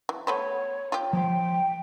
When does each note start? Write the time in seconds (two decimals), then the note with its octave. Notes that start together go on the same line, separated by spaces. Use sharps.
0.09 E3
0.27 A3 B3 C5 C#5
0.92 F4 G4
1.13 F3 G5 C6